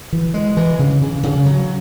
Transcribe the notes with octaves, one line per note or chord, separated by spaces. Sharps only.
E3
G#3
E3
C#3
C#3
C#3
F#3